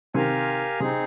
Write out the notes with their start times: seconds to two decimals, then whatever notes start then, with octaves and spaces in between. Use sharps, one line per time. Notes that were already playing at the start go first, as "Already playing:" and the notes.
0.14 C3 D#3 G4 A#4 F5 G#5
0.80 C3 C4 D#4 G#4